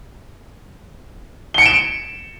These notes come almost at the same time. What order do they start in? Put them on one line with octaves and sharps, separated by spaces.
G7 C#7 D7 E7